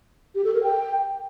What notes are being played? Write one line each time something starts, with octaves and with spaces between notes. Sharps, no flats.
G4
A4
A#4
G5